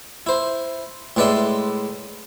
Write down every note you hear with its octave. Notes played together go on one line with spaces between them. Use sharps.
E4 C5
A2 G#3 B4 D5 E5 C6